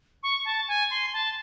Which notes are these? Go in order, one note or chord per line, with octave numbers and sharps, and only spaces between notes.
C#6
A5
G#5
C6
A5